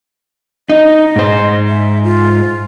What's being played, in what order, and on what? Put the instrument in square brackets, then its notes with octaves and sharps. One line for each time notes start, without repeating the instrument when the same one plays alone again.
[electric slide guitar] D#4 [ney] D#5
[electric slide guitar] G#2 C5
[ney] E5
F4